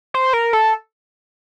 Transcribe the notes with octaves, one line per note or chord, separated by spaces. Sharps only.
C5
A#4
A4